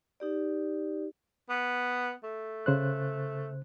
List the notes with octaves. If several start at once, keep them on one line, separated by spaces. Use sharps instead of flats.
D#4 G4 D5
B3
A3
C#3 C5 F#6